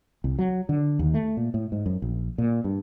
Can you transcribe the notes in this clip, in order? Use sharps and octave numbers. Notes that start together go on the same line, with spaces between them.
C2
F#3
D3
D#2
A3
A#2
A2
G#2
F#2
A#1
A#2
G2